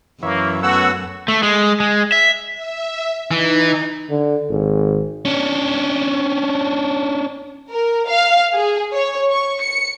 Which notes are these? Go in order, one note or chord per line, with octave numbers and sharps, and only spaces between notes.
F#2 E3 A#3 C#5 E5
A3 B3 C#4 F#4 F#5 E6
A3
G#3
G#3
E5
E5
E3 D#4
D3
G#1
C#4 D4
A#4
F5
G#4
C#5
C#6
C#7